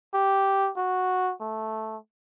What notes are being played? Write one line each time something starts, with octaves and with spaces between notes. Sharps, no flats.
G4
F#4
A3